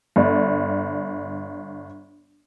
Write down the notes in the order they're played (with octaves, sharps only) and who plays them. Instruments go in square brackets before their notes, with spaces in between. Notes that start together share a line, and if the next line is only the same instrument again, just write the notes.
[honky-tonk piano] G1 D5